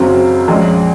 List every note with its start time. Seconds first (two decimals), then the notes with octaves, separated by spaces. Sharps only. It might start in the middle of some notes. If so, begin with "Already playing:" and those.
Already playing: F#1 F#2 C#3 F#3 C4
0.48 A#1 A#2 G#3 C#4